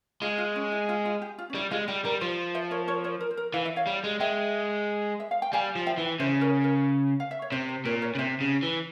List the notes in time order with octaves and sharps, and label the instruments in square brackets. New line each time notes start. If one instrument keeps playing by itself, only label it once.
[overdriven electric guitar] G#3 [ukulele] F4
[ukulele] F4
C#4
E4
F4
F4
G4
F4
C#4
[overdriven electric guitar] G3 [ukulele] E4
[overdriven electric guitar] G#3 [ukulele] F4
[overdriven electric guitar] G3 [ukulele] G4
[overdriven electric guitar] G3 [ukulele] A#4
[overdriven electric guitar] F3 [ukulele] C5
[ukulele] C5 E5
A#4 C#5
A#4 C#5
A#4 C#5
A#4
C5
A#4
[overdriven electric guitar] E3 [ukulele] F5
[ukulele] E5
C#5 F5
[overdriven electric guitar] G3
G#3
[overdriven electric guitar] G#3 [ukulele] E5 G5
[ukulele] E5
F5
G5
[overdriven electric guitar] G3 [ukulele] F5 G#5
[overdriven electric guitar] F3
[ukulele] E5 G5
[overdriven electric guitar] E3
[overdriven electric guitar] C#3 [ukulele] C5 E5
[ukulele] A#4 C#5
A#4
F5
E5
C#5
[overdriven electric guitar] C3 [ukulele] C5
[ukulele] C5
[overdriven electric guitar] A#2 [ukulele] A#4 C#5
[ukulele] A#4 C#5
[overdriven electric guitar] C#3
[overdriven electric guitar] C3 [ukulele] C5 E5
[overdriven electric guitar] C#3
E3